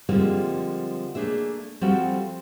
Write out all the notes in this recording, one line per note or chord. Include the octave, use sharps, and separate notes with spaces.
D3 F3 G3 G#3 A#3 C4
A3 A#3 D4 G#4 E5
F3 G3 C4 F#4 G4 A4